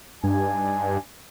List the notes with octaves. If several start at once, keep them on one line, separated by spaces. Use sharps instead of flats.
G2 D4 D#4 G#5